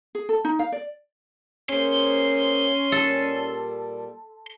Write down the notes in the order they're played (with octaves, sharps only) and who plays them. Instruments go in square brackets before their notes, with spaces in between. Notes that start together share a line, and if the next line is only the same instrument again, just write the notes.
[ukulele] G#4
A4
D#4
F5
D5
[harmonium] A#3 G#4 C5 [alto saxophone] C#4 [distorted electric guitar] C6
[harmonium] A#2 G3 [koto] A4